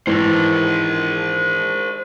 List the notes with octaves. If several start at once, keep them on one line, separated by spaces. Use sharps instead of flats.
G#2 D#3 E3 A#4 C5